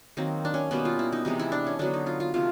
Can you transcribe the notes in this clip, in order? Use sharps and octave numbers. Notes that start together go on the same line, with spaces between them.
D#3 F#3 A#3 C4
D4
C#4
B2 G3 A#3 B3
F4
E4
D#4
C3 E3 G#3 B3 D#4
E4
D4
C#4
D3 F#3 B3 D4
D#4
F4
F4
C3 F3 A3 F4